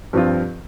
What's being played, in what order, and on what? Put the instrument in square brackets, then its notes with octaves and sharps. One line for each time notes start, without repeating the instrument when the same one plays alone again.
[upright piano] G2 F3 C4 F4